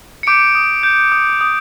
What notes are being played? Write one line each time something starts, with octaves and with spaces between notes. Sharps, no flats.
C#7
D6 G6 D7
D#6
G6
D#6
D#6